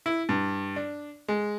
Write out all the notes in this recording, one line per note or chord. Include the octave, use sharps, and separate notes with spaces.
E4
G2
D4
G#3